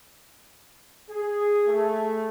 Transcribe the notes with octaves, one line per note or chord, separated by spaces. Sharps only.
G#4
A3